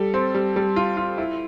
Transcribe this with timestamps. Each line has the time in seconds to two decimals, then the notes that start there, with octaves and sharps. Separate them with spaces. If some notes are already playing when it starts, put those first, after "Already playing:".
Already playing: G3 A4
0.14 C4
0.35 G3
0.56 G3
0.76 F4
0.97 F4
1.18 E4